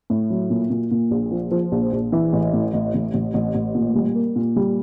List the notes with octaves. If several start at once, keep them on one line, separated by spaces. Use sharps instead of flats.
A2
F#3
A#2
A#2
A#2
A#1
F3
F3
A#1
A#1
E3
A1
A2
A1
A1
A1
A1
A1
A#2
G3
A#3
A#2
G3